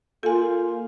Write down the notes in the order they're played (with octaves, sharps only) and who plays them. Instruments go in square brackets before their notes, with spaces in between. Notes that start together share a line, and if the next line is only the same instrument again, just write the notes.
[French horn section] A#3 F4 [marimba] A4 G#5